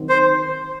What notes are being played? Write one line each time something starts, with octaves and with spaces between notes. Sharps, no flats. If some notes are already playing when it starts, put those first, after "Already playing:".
Already playing: D#3 F#3 C4
C5